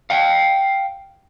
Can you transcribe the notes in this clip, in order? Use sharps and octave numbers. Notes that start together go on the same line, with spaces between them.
F5 G5